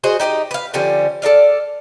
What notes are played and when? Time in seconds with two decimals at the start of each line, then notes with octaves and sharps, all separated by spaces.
0.03 F#4 G#4 C5 D#5
0.20 D#4 G4 D5 D#5
0.51 B4 F5
0.74 D3 F3 G3 C#4
1.22 A4 A#4 D5 F5